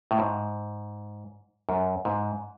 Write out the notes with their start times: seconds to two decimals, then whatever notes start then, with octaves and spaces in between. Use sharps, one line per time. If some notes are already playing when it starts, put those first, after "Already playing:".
0.11 A2
0.19 G#2
1.69 F#2
2.05 G#2